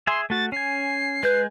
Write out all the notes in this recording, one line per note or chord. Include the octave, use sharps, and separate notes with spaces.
G#4 E5 G#5 C6
A3 F#4 A6
C#4 G#5 C7
G#3 B4 G6